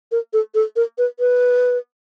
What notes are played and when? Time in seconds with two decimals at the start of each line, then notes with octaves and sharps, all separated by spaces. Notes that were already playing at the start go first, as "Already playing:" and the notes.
0.12 A#4
0.33 A4
0.55 A4
0.76 A#4
0.98 B4
1.20 B4